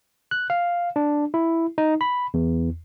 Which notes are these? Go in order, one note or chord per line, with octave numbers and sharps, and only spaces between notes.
F#6
F5
D4
E4
D#4
B5
E2